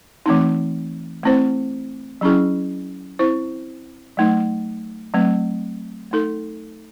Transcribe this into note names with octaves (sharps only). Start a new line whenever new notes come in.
E3 A3 C4 D#4
A3 C4 E4 C5
F#3 C#4 E4 G#4
C4 E4 C5
F#3 A3 D#4
F#3 A3 C4
A3 D#4 A4